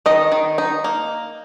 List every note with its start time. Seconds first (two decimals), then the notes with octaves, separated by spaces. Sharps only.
0.06 D#3 D#5
0.32 D#3
0.58 D#4
0.84 A#3